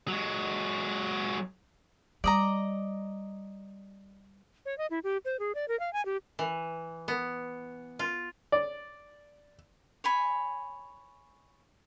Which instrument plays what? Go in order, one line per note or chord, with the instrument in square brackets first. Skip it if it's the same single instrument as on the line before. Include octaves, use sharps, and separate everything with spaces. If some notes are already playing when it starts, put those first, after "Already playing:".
[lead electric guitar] F#3 G#3
[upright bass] G3 [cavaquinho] D5 D#5 A#5
[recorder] C#5
D#5
E4
G4
C5
G#4
D5
A#4
F5
G#5
G4
[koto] E3
B3
F4
[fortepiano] D5
[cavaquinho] C#5 G#5 B5